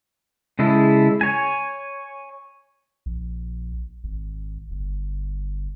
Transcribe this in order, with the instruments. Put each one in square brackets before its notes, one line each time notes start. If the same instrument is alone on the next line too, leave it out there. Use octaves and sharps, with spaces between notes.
[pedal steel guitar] C#3 G#3 E4 A4
C#5 G#5
[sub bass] A#1
G#1
G1